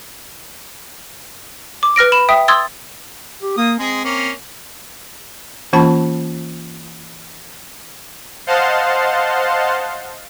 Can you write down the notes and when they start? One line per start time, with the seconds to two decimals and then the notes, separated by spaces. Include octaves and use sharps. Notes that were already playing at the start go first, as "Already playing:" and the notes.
1.83 D6
1.96 B4 F6 A#6 D7
2.12 B5 E7
2.29 E5 G5 D#6
2.48 C6 D#6 E6 G#6 A6
3.42 G4
3.57 A#3 D#6
3.79 G#3 C4 G#4
4.05 A#3 C#4
5.73 E3 A#3 C#4 F4 A5 B5
8.47 C5 D#5 F5 F#5 A5 C6